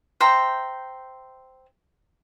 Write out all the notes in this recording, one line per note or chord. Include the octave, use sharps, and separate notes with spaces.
C5 E5 G5 A#5